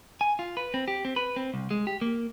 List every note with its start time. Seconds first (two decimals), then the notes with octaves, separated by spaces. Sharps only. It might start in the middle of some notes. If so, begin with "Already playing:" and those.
0.21 G#5
0.39 F4
0.57 B4
0.74 C4
0.88 G4
1.05 C4
1.16 B4
1.36 C4
1.54 C2
1.71 G#3
1.87 G4
2.01 A#3